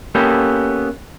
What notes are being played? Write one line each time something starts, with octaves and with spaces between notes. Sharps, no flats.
A#3 B3 C#4 G4 A4